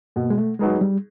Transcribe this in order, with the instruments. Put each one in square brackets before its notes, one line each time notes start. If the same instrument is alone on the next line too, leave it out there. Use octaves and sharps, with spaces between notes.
[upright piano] B2 [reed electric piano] A#3
[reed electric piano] G#3
A3
[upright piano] F#3 B3 D#4 G#4 [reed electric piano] G#3
[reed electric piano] G3